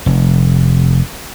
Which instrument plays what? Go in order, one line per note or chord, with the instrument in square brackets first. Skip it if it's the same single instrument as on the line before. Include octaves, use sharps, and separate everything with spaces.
[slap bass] F1